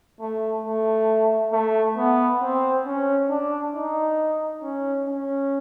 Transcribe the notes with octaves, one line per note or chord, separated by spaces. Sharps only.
A3
A3
A3
B3
C4
C#4
D4
D#4
C#4
C#4